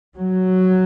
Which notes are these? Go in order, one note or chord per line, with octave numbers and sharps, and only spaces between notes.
F#3